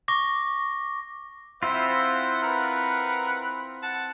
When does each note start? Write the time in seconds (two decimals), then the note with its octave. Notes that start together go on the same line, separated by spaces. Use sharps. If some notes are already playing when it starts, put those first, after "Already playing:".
0.08 C#6 D6 A#6
1.63 C4 E4 F4 C5 E5 F#5
2.43 A#4 B4 F#5
3.83 F#5 A5